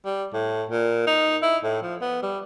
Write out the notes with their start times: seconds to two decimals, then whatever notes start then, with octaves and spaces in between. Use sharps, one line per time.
0.06 G3
0.34 A2
0.69 A#2
1.07 D#4
1.42 E4
1.64 A2
1.82 F3
2.01 B3
2.23 G3